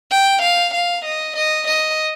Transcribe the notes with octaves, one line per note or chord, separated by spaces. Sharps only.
G5
F5
F5
D#5
D#5
D#5